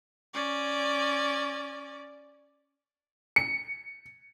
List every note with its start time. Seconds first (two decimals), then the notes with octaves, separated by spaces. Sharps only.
0.34 C#4 D5
3.36 C#7